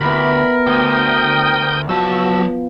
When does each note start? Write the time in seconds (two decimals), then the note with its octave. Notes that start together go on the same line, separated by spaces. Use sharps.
0.01 D2 B3 E4 G4 A#4 B5
0.66 D2 C5 G5 D#6 G6
1.89 B2 F3 F#3 F#4 A5 E6